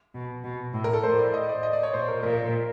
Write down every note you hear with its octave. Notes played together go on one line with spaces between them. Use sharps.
B2
B2
A2
A#4
A4
A2 C5
D5
D#5
D5
D#5
D5
C#5
A#2 C5
A#4
A#2 A#4